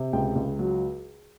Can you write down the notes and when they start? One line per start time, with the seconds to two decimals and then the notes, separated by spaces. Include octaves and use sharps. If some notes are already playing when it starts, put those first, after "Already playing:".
Already playing: C3
0.13 C#2 G5
0.35 C#2
0.59 F#3